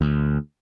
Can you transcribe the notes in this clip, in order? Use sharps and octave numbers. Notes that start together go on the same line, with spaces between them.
D2